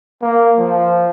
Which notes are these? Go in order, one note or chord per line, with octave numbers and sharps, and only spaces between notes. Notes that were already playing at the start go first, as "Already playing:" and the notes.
A#3
F3